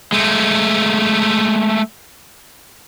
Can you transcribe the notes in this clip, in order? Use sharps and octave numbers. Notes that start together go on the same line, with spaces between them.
G#3 A3